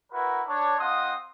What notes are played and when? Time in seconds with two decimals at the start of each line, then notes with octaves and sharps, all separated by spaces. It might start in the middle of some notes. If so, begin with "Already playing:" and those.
0.12 E4 F#4 A#4 B4
0.47 D4 C#5
0.78 C4 F4 D#5 F#5 C6 D#6